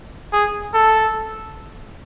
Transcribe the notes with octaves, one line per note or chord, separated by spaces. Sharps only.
G#4
A4